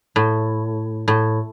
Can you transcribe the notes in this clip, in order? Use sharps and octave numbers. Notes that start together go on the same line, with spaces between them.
A2
A2